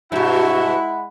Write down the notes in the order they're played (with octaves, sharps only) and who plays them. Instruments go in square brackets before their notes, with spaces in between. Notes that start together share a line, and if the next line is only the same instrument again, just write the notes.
[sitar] G2 B2 [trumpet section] G#3 F#5 B5 [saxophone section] E4 [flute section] F#4